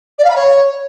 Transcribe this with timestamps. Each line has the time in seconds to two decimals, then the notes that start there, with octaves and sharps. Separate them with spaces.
0.19 D5
0.24 F5
0.30 B5
0.36 C#5